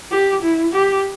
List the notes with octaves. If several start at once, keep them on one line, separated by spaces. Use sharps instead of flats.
G4
E4
G4